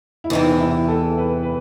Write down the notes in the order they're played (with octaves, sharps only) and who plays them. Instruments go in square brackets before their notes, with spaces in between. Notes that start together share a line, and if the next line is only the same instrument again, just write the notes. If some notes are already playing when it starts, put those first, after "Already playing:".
[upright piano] E4
[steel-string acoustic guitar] E2 C3 E3 [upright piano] D#4
[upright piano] E4
A4
B4
B4